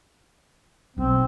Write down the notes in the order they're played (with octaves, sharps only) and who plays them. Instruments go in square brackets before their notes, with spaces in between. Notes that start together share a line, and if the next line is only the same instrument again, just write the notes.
[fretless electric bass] D#1 B1 [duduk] C4